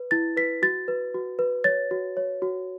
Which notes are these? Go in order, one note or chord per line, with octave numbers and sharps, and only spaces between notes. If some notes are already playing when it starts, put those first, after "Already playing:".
Already playing: B4
E4 A6
B4 B6
F#4 A6
B4
F#4
B4
C#5 A6
F#4
C#5
F#4